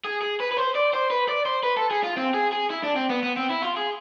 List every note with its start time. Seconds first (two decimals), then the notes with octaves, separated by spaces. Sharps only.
0.04 G#4
0.22 G#4
0.41 B4
0.52 B4
0.58 C5
0.75 D5
0.93 C5
1.10 B4
1.28 D5
1.46 C5
1.63 B4
1.77 A4
1.90 G#4
2.03 F4
2.17 C4
2.34 G#4
2.53 G#4
2.70 E4
2.83 D4
2.96 C4
3.09 B3
3.23 B3
3.36 C4
3.50 E4
3.62 F4
3.77 G#4